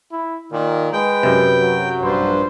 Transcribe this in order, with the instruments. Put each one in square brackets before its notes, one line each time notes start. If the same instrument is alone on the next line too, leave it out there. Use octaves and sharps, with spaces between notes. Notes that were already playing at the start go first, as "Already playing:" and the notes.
[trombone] E4
[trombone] A#2 [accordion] D#3
[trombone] G#3 [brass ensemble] B4 [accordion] G5
[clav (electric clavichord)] F#2 C3
[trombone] F#3
[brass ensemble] A#1 B4 C5 [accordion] G2